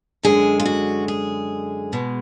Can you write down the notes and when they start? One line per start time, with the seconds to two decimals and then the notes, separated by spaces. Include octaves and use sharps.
0.23 F#2 D3 G#3 G#4
0.60 F4
0.65 F#4
1.08 G#4
1.93 B2 G#3